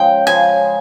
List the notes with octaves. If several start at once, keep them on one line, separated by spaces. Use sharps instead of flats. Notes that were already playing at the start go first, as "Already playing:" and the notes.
Already playing: C#3 F3 G#3 G5
C#3 F3 G#3 G#5